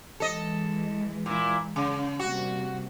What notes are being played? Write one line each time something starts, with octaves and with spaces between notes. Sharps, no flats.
E3 G#3 A4 D#5
A#2 E4
C#3
C3 G3 A#3 F#4